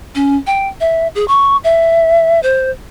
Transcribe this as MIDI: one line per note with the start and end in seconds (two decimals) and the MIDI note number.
0.15 0.36 61
0.47 0.68 79
0.80 1.08 76
1.15 1.27 68
1.28 1.57 85
1.64 2.40 76
2.43 2.71 72